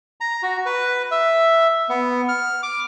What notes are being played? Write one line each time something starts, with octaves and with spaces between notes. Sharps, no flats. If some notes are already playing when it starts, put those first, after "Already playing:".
A#5
F#4
B4
E5
B3
F6
D6